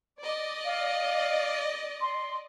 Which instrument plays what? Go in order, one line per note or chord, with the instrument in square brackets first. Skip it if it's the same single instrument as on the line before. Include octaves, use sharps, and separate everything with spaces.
[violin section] D5 D#5
[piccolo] F5
C6